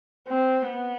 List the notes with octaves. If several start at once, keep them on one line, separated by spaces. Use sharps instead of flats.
C4
B3